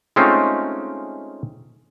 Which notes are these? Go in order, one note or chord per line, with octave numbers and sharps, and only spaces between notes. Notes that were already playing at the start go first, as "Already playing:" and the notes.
G#3 A3 C4 C#4 D#4 F4